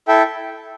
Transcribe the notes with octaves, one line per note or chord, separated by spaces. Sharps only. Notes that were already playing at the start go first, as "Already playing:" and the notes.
E4 A4 E5 G5